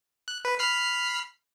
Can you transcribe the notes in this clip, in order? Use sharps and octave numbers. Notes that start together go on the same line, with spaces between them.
F#6
B4
B5 F6 C7